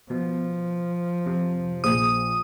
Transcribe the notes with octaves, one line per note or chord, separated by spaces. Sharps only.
B2 F3
F2 C3
A#1 G#4 C5 D#6